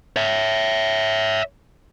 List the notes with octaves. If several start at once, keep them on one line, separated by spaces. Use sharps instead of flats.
C#5 E5